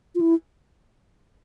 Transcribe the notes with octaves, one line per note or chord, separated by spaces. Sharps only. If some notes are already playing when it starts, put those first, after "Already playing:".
F4
E4